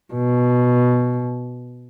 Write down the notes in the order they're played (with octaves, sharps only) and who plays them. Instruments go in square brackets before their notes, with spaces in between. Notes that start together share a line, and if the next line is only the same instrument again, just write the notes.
[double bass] B2